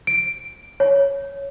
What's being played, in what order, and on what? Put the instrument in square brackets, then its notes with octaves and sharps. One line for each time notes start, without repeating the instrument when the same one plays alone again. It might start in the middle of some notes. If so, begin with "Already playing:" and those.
[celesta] D7
C#5